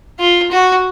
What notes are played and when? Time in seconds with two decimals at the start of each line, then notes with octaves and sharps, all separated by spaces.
0.20 F4
0.51 F#4